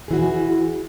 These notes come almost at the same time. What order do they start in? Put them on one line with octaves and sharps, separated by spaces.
G#4 E3 F#4